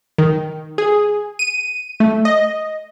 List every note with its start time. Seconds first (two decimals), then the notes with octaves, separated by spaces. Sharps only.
0.18 D#3
0.78 G#4
1.39 D#7
2.00 A3
2.25 D#5